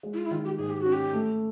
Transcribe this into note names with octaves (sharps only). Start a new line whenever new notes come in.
G#3
E4
F4
E4
D#3 F4
G4
G#2 G#4
G4
C#4 F#4
G4
A3